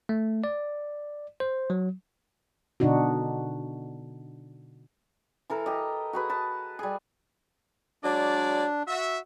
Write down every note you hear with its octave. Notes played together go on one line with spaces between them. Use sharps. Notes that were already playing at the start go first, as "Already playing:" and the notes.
A3
D5
C5
F#3
B2 D3 D4 D#4 F#4
E3 A4 A#4
G4 D#5
F#4 G#4 B4
B4 A5
G3 G#4
F#3 G#3 D4 D5
F#4 E5